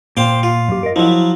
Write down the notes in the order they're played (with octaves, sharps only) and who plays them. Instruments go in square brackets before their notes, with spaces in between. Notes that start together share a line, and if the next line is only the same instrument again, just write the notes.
[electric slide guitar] A#2 [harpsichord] C5 F5 G5
[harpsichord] F4
[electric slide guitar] F#2 G4
A#4 D#5
[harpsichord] F3 F#3 [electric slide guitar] E4